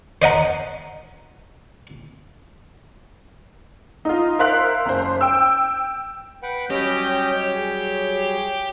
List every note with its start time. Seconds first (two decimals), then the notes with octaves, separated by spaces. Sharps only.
0.22 C5 D#5 F#5 A#5
4.05 D#4 F4
4.39 A#4 C5 E5 F5 C6 F#6
4.86 F#1 C5
5.21 G5 E6
6.43 B4 F#5 G5
6.70 F#3 G3 C#4 G4 C#5 D#5 G6
7.55 G#4